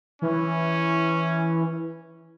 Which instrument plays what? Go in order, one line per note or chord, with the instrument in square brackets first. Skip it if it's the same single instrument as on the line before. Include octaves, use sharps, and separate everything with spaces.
[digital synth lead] E3 [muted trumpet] C#4